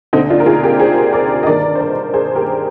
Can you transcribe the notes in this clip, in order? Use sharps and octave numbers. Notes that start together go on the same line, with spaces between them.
D2 D3 C4 D#4
D4 F4
A#4
F4 G#4
G4 A#4
G#4 C5
A#4 D5
D#5
G2 D#3 A#4 D5
C5
A#4 D5
G#4 C5
G4 A#4